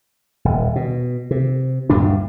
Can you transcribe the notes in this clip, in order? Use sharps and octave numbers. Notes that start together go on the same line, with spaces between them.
D#1
B2
C3
D1 G2 A#2 D4